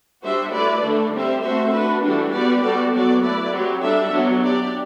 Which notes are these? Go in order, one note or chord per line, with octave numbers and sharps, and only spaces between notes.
G3 D4 F#4 C5 E5
A3 E4 B4 D5
D3 A3 D4 A4
G3 C4 G4 C5 E5
A3 C4 F#4 C5 E5
D4 F#4 B4
E3 G3 D4 F#4 A4
G3 B3 F#4 B4 D5
G3 B3 F#4 A4 D5
F#3 B3 F#4 A4 D5
A3 E4 B4 D5
F#3 C4 G4
G3 D4 A4 E5
F#3 B3 D4 F#4
D4 G4 D5